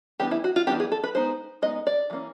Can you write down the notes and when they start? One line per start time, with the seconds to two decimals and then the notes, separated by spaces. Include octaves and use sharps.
0.20 E3 G3 B3 D4 G4
0.31 E4
0.44 F#4
0.56 F4
0.67 E3 G3 B3 D4 G4
0.80 G#4
0.92 A4
1.04 B4
1.15 G#3 B3 D#4 C5
1.62 G#3 B3 D#4 D#5
1.87 D5
2.10 E3 G3 A#3 C#4